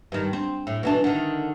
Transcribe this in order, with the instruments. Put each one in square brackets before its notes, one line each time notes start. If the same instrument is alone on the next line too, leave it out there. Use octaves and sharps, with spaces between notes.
[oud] G2 D#3
C4
A2
B2 E3 D4
D3 D#3